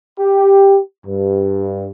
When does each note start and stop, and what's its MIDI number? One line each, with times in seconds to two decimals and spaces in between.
0.19 0.78 67
1.05 1.90 43